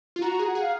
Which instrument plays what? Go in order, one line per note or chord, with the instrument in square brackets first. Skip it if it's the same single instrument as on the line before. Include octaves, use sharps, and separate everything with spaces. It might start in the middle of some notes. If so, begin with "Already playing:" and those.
[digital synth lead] F4
[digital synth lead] F#4 [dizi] A#5
[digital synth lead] G#4
[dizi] F#5
[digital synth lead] G#4
[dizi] F5